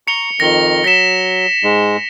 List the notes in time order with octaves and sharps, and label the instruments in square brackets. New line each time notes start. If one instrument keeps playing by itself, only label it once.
[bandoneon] A#5 C#6 [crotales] C#7 F7 G7
[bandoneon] F2 D#3 [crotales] A#6 G7
[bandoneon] F#3 [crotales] A#6 B6 E7
[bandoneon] G#2 G#3